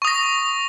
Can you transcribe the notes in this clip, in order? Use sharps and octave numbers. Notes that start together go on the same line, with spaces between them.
C#6 D#6 A#6